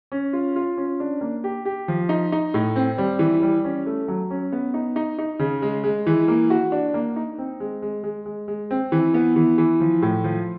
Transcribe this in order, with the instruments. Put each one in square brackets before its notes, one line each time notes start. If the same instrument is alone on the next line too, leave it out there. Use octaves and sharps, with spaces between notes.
[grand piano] C#4
F4
F4
C#4
D4
A#3
G4
G4
F3
D#4
D#4
A2
C4
G3
E3
G3
C#4
A3
F#3
C#4
B3
D#4
D#4
D#4
C#3
G#3
G#3
E3
A#3
F#4
D4
A#3
D#4
C4
G#3
G#3
G#3
G#3
G#3
C4
E3
B3
E3
E3
F3
A2
F3